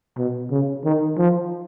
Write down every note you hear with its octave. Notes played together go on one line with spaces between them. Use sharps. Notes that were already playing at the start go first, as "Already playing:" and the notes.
B2
C#3
D#3
F3